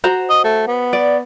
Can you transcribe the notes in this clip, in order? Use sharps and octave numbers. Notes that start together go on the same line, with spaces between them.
F#4 C5 A#5
D#5
A3
B3
D5